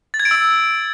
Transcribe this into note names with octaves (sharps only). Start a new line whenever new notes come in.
A6
G#6
D7
E6